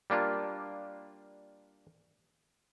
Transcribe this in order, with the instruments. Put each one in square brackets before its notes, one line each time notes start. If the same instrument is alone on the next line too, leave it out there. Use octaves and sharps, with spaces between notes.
[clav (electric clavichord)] G3 A#3 D4 F4